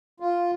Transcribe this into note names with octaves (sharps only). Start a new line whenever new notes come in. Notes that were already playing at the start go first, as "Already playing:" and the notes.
F4